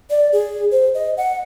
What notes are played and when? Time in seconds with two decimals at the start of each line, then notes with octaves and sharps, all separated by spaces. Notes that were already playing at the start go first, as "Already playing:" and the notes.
0.10 D5
0.33 G#4
0.71 C5
0.94 D#5
1.17 F#5